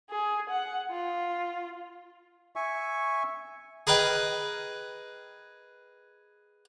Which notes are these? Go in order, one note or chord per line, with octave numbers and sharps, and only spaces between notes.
G#4
F#5
F4
E5 G#5 C#6
G#4 A#4 B4 D#5 G5